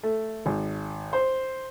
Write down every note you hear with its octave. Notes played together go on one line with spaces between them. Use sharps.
A3
G#1
C5